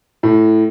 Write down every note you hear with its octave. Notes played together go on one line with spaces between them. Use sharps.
A2